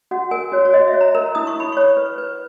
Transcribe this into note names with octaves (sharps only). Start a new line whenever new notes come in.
F#4 F#5
A#4 G#5
F#4 C#5
C#5
F#4 D#5
E5
C#5
A#5
A#4 A#5
E4 D#6
C#6
E4 B5
C#5 C#6
B4
B4